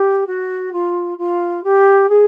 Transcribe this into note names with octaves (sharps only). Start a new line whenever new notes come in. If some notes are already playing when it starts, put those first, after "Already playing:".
Already playing: G4
F#4
F4
F4
G4
G#4